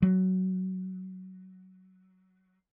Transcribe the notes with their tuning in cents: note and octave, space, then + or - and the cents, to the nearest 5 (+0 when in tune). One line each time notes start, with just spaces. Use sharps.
F#3 +15